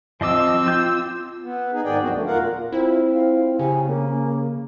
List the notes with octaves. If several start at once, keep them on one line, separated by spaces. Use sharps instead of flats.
F3 C4 D#5 D6 E6
F4 G6
B3
D#4 G#4
G#2 D#3 B3 G#4 D5 G5
D2 F3 F#3 C4 D4 F#4
D#3 F#3 A3
E2 A#2 F4 A#4 F5 F#5
C4 E4 F4
F5
C#3 G4 G#5
A#3 C#4